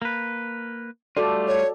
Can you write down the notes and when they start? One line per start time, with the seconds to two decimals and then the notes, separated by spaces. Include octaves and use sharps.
0.02 A#3 B4
1.17 G3 A3 F4 F#4 A4 D5
1.47 C#5